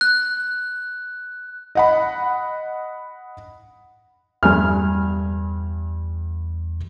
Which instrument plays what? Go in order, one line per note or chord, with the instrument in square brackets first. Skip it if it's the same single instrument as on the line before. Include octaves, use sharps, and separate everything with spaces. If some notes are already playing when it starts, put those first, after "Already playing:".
[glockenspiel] F#6
[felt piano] D#5 F#5 B5
[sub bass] E2 [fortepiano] G2 G#5 F6